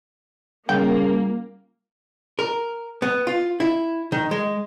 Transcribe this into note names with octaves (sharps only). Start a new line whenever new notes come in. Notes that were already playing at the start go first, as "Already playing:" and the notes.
C#3 G3 A#3 C#4 F4 G5
A#4
B3
F4
E4
D#3
G#3